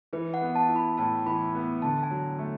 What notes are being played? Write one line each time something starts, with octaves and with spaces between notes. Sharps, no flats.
E3 B4
F#5
B3
A5
E4
B5
A2 A5
E3 B5
B3
D3 A5
G#5
F#3
A3